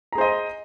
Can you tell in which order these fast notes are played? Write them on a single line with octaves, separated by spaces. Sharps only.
A#5 G#4 C5 D#5